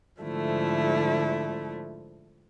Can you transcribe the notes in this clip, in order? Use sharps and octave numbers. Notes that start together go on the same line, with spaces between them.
G#2 D3 F3 A3 E4